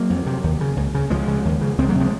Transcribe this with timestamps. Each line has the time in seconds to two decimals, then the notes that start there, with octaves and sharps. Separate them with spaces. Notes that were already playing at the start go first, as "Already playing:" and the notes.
Already playing: F#3 A#3
0.10 F2
0.26 C3
0.44 D#2
0.61 C#3
0.76 C#2
0.95 C#3
1.10 C#2 F3 G#3
1.28 C#3
1.45 D#2
1.61 C#3
1.78 C#2 G#3 C4
1.89 F#3 A#3
1.95 C3
2.00 F3 G#3